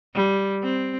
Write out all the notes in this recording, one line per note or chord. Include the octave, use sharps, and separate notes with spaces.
G3
C4